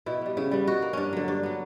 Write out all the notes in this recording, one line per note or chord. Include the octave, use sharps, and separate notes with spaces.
B2 E4
G3 B3
C#3 E4
G3 B3
B2 F#4
A#3
G2 C#4 D4
D3 F#3
G2 D4
F#3 B3